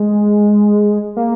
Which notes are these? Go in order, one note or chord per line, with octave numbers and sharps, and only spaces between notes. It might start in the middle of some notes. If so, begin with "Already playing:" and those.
Already playing: G#3
A#3